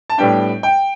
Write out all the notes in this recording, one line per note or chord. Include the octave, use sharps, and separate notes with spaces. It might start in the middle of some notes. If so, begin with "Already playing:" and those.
A5
A2 G3 B3 D4 G5
G5